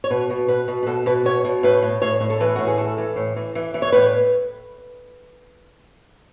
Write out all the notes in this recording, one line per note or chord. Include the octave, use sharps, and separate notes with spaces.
C#5
B2 B4
B2
B2 B4
B2
B4
B2 A4
B2 B4
B2 C#5
B2
A2 B4
A2
A2 C#5
A2
A4
E3 B4
A2 F#4
G#4
E3 A4
E3
A2
E3
E3
E3
C#5
A2 B4